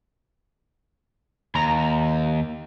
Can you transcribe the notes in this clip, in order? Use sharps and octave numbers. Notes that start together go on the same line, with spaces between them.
D#2 A#5